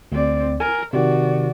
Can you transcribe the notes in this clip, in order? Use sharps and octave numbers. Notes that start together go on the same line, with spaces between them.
D2 C4 D5
A#4 G#5
C3 D#3 F#4 D5